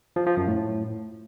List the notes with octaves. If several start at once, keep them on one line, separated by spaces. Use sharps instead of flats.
F3
F3
F#2
A2